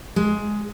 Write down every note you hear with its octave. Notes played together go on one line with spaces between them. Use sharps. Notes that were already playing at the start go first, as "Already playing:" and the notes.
G#3